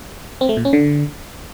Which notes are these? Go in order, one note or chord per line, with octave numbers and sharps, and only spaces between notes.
C4
A3
A#2
C#4
D3